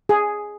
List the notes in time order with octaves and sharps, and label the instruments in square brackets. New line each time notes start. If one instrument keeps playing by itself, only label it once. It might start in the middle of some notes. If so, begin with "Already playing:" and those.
[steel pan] G#4